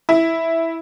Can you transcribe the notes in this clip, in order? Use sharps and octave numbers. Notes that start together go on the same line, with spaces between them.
E4